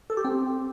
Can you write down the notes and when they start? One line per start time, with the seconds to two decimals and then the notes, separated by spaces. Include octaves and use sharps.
0.10 A4
0.17 G4
0.25 C4